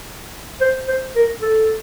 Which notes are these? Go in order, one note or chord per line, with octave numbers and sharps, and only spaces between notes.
C5
C5
A#4
A4